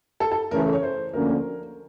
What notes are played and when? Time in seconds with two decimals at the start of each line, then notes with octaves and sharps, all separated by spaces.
0.20 A4
0.31 A4
0.51 C#3 E3 A3 A#4
0.73 C#5
0.83 C5
1.14 D2 D3 F3 A#3 C#4 A#4